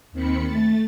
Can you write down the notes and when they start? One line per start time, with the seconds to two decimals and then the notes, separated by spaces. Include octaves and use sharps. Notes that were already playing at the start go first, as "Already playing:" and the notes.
0.12 D#2 D#3 C4 B5 C#7
0.45 A3 A6